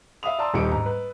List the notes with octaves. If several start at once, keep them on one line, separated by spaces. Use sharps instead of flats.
E5 F5 B5 D#6 F7
D5 A5 A#5 C6 E6
D#1 G3 D#4 C#7 D7
G#2 A#5
B4